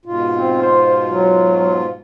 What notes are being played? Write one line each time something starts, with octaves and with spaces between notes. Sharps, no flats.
G#2 B2 F4
C4
C5
F#3